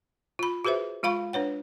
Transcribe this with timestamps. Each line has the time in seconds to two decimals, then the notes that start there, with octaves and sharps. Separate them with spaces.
0.39 F4 B5
0.65 F#4 G#4 B4 C5 E5
1.03 G#3 F4 F5 B5 C#6
1.33 D4 B4 C#5 F#5